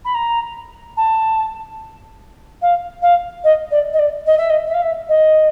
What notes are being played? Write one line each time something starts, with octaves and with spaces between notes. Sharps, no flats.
B5
A#5
A5
F5
F5
D#5
D5
D#5
D5
D#5
E5
D#5
E5
F5
E5
D#5